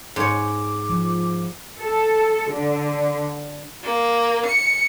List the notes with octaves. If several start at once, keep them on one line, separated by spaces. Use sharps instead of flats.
G#2 C#5 D6
F3
A4
D3
A#3
C#7